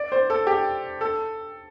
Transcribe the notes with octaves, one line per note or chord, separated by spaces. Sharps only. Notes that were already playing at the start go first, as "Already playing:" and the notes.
Already playing: D5
C5
A4
G4
A4